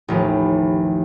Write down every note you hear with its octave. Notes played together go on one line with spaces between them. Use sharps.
A1 D#2 F3 B4